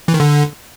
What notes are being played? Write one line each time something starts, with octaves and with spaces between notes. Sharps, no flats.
E3
D#3
D3